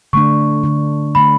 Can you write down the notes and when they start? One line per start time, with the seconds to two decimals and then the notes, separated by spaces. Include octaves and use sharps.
0.13 D3 A3 D4 C#6
0.64 D3 A3 D4
1.15 D3 A3 D4 B5